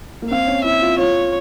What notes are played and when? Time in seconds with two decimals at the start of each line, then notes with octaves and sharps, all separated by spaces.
0.22 A#3
0.30 C4 F5
0.47 C#4
0.64 E4 E5
0.82 F4
0.98 F4 C#5